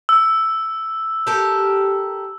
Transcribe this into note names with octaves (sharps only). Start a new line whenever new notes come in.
E6
G4 A4 A#4